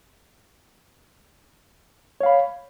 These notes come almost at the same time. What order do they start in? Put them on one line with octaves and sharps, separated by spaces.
C#5 F5 B5